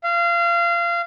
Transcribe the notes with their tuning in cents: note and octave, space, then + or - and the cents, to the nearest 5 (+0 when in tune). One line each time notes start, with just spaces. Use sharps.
F5 -25